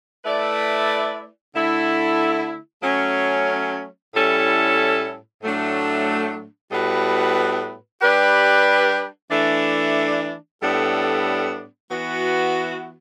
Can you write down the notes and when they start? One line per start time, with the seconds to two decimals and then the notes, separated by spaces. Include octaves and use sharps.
0.24 A3 E4 B4 D5
1.54 D3 A3 E4
2.83 F#3 A3 C#4
4.13 A2 G3 C#4 E4 A4
5.42 A2 F#3 A3 D4
6.71 A2 G3 B3 F#4 B4
8.01 G3 D4 G4 B4
9.31 E3 A3 D4
10.61 A2 G3 B3 D4 A4
11.90 E3 B3 F#4